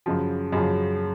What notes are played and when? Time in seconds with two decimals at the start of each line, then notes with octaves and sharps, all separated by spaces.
0.06 F#2 C#3 F3
0.52 F#2 C#3 F3